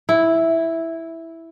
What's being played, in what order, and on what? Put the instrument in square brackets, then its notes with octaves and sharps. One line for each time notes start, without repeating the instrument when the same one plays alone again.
[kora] E4